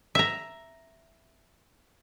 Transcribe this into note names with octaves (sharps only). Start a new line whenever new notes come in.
E5 A#5